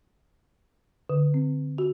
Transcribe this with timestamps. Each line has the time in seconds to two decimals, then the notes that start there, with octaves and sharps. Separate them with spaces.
1.10 D3
1.34 C4
1.78 F#4